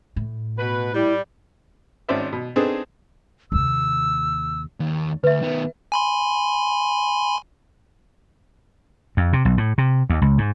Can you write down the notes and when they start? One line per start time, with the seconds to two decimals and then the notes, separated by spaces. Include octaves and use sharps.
0.16 A2
0.58 B2 B4
0.94 G3 E4
2.09 G#1 C4 C#4 C5 D5 E5
2.32 B2
2.56 B3 C4 D4 D#4 G#4 A4
3.52 D#2 C3 E6
4.80 D#2
5.24 D2 B4 E5
5.42 D#3 B3
5.92 G#5 B5 C6
9.17 F2
9.33 C3
9.45 B1
9.58 A2
9.78 C3
10.10 D#2
10.22 C#2
10.38 G#2